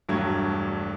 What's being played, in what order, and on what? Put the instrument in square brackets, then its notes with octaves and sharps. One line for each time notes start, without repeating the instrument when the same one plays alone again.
[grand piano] E1 G2 F#3 A3 G#6